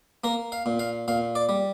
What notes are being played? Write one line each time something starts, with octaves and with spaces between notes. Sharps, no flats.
A#3 A#4
F5
A#2
F5
A#2 F5
D5
G3